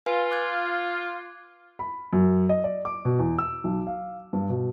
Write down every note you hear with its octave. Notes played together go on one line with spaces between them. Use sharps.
F4 B4 F5 G#5
D6 F#6 G#6
B5
F#2
D#5
D5
D6
B2
E2
E6
B1
F5
G2
B2